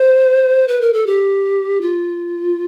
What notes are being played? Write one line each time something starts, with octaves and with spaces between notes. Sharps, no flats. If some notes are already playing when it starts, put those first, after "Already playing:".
Already playing: C5
B4
A#4
A4
G4
F4